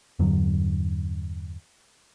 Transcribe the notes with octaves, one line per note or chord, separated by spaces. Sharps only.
E2 G2 D3 F#3